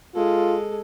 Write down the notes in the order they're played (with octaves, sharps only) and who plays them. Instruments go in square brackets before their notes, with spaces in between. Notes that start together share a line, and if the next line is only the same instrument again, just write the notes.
[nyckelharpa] G#3 A4 [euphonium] F4